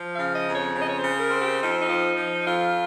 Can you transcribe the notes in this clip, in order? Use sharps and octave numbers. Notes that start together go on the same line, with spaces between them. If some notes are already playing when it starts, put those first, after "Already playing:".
Already playing: F3
F5
C#3
D#5
F2
C#5
C#3 C#5
D#5
C#5
C5
C#3
A#4
C4
G4
F2 D#4
D#4
F3
F3
F2 F4